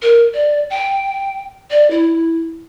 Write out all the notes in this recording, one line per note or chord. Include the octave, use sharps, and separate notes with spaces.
A#4
D5
G5
D5
E4